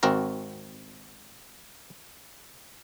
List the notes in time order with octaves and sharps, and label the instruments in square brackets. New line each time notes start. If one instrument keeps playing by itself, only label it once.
[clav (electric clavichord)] G#1 C4 F#4 A#4 A#5